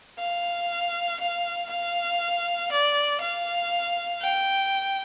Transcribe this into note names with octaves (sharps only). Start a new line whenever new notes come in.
F5
F5
F5
D5
F5
G5